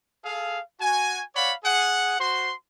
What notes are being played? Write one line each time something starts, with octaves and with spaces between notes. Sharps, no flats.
G#4 A4 F5
F#4 G#5
C#5 D5 F5 F#5 B5
G#4 F#5
F#4 C5 C6